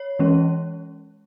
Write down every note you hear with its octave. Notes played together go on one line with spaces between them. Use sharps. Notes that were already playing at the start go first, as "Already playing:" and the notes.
Already playing: C#5
E3 G#3 C#4